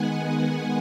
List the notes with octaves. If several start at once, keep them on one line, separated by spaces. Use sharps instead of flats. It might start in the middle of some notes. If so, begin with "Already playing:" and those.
Already playing: D#3 G#3 B3 F#5 G#5